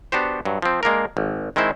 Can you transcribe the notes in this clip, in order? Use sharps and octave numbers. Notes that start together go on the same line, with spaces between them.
B3 D4 F#4 G4 C5
G2 F#3
F3 C4
G#3 A#3 D4 A#4
G#1
D#3 G#3 C4 E4 C5